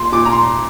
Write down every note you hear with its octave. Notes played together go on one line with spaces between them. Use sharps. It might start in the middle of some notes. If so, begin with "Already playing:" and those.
Already playing: A#2 C6
A#2 D6
A#5
C6